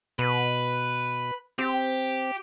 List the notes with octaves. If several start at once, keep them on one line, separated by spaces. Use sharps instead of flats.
B2 B4
C4 G4